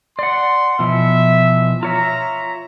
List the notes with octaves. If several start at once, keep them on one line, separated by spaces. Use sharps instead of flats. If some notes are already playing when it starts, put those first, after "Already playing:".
D5 F#5 C6
B2 E3 F3 E5
F4 C#5 E5 A#5